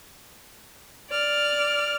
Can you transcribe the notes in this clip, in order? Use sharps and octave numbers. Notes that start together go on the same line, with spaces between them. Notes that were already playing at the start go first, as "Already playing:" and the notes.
D5 F6